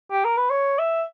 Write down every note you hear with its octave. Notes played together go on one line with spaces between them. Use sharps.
G4
A#4
B4
C#5
E5